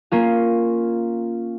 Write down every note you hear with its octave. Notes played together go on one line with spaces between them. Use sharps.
A#3 C#4 F4